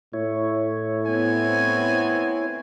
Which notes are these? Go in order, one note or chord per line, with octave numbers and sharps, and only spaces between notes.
A2 E4 C#5
B3 C4 G#5